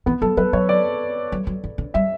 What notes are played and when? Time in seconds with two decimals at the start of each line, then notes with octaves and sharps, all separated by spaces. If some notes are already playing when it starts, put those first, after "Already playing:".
0.06 E3 B3
0.22 F#3 A4
0.37 F#3 B4
0.53 F#3 C#5
0.69 D5
1.32 F#3
1.47 F#3
1.64 E3
1.78 D3
1.94 G3 E5